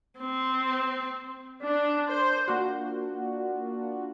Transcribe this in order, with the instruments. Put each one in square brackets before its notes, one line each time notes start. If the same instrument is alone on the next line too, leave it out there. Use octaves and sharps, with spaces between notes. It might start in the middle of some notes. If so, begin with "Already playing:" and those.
[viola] C4
[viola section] D4
C5
[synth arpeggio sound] A#3 D4 F4 F#4